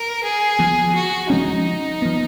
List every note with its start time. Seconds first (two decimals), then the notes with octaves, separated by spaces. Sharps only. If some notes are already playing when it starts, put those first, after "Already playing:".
Already playing: A#4
0.24 G#4
0.59 F3 B3
0.95 F#4
1.30 F3 G#3 C#4 D#4
2.02 F3 B3